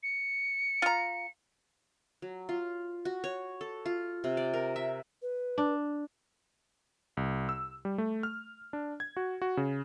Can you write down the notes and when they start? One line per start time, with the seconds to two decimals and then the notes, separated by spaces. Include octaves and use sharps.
0.03 C#7
0.82 F4 A#5
2.22 F#3
2.49 F4
3.05 F#4
3.24 C#5
3.61 A4
3.85 F4
4.24 C3
4.37 D5
4.54 A#4
4.76 E5
5.22 B4
5.58 D4
7.17 C2
7.49 E6
7.85 G3
7.98 A3
8.23 F6
8.73 D4
9.00 G#6
9.17 F#4
9.42 F#4
9.57 C#3